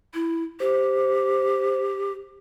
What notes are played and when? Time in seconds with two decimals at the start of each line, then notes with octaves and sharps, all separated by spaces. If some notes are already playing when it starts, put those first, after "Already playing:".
0.14 E4
0.60 G4 C5